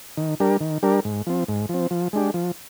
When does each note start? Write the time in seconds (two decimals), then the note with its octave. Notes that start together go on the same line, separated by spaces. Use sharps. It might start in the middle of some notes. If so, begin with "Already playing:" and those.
0.17 D#3
0.40 G3 D4 G4 A#4
0.61 D#3
0.83 G3 D4 G4 A#4
1.05 G#2
1.27 F3 C4
1.49 G#2
1.69 F3 C4
1.91 F3
2.13 G#3 D4 G4
2.34 F3